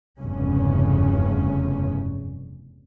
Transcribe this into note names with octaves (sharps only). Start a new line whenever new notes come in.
F1 E2 G2 C#3 C#4